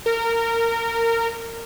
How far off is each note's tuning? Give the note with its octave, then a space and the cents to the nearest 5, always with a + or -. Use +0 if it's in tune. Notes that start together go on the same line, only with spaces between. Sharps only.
A#4 -25